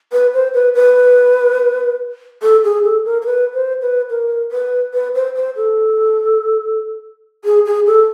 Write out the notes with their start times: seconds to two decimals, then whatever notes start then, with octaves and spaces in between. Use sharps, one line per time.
0.12 B4
0.34 C5
0.54 B4
0.75 B4
2.42 A4
2.64 G#4
2.84 A4
3.05 A#4
3.22 A#4
3.26 B4
3.54 C5
3.82 B4
4.10 A#4
4.52 B4
4.94 B4
5.15 C5
5.36 C5
5.56 A4
7.45 G#4
7.65 G#4
7.86 A4